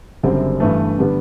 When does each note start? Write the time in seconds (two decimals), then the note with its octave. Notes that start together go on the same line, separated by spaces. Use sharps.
0.23 F#1 F#2 D3 G3 C4
0.60 G2 E3 A3
0.99 D3 G3 B3